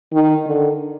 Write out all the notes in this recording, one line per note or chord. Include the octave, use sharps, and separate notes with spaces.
D#3
D3